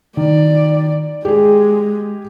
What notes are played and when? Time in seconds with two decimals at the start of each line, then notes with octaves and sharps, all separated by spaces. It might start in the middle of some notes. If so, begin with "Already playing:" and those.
0.17 D#3 D5
1.25 G#3 G4 G#4